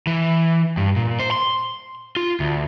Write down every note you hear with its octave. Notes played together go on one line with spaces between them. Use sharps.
E3
G2
A#2
C5
C6
F4
D2